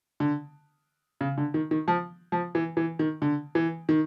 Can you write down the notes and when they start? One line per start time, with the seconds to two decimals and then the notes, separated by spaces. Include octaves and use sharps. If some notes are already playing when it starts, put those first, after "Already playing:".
0.20 D3
1.21 C#3
1.38 D3
1.54 D#3
1.71 D#3
1.88 F3
2.32 F3
2.55 E3
2.77 E3
2.99 D#3
3.22 D3
3.55 E3
3.89 D#3